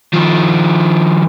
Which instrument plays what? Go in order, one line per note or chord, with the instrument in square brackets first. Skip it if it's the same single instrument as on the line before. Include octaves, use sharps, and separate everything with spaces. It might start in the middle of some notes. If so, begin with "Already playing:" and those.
[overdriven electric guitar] D#3 F3